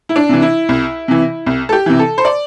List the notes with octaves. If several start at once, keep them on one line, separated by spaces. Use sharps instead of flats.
E4
D4
C3 E3
E4
C2
C3 E3
C2
A4
G4
C3 E3
A4
C5
D5